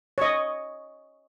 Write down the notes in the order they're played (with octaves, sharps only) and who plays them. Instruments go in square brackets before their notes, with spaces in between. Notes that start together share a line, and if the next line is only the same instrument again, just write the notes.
[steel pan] C#5 D#5